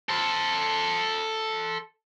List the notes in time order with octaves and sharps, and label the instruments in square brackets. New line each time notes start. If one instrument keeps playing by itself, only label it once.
[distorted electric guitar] A4 C5